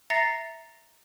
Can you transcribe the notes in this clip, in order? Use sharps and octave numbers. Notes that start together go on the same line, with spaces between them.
E5 A#5 A6 A#6 C7 C#7